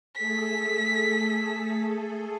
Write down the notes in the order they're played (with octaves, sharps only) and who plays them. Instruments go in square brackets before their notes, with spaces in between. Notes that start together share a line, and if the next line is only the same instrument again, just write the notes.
[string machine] A3 G#4 A4 [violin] B6